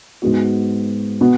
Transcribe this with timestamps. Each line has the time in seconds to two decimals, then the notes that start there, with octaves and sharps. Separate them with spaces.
0.22 G#2 G#3 B3 F#4
1.21 B2 B3 F#4